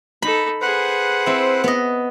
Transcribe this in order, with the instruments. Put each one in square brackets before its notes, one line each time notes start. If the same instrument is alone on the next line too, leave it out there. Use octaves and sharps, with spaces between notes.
[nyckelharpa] D#4 A4 [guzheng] B5
[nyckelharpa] G#4 F#5 [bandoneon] B4 C5
[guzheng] C4 E4
B3 D#5